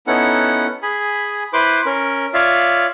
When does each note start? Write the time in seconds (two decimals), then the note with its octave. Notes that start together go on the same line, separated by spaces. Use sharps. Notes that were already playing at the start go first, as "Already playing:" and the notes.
0.07 B3 C#4 D#4 E4 A4 F#5
0.83 G#4 G#5 B5
1.53 E4 B4 C5 B5 C6 D6
1.86 C#4 A#4
2.34 F4 C#5 D5 E5 F5